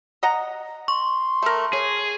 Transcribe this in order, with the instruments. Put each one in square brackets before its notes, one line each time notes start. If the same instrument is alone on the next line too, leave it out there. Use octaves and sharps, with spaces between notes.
[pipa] D#5 F#5 A#5
[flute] C6 [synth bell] C#6
[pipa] A3 A#4
[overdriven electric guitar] G#4 [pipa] C#5